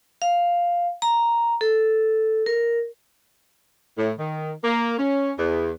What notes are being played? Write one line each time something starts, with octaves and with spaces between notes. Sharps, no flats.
F5
A#5
A4
A#4
A2
D#3
A#3
C#4
E2